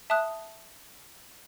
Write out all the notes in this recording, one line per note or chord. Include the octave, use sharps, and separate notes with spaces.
E5 A5 D#6 F#6